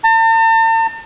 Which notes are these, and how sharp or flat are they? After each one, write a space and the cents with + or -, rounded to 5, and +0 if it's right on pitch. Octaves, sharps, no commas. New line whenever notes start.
A5 +45